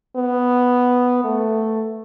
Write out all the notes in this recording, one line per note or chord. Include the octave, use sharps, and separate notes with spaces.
B3
A3